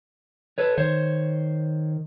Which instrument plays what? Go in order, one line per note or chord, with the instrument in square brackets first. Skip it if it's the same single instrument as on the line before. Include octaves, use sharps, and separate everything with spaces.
[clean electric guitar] A4 B4 C#5
[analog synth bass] D#3 [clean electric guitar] C5 C#5